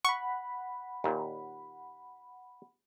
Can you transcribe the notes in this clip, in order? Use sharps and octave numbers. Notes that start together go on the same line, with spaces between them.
F#5 B5 C#6
D#2 A#2